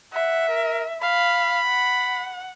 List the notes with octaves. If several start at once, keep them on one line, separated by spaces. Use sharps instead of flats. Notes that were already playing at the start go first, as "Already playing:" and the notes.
E5 F#5
A#4
F5 B5
F#5